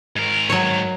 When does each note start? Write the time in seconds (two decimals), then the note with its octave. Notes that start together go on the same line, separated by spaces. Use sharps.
0.16 G#2 A#4
0.50 F#3 C#5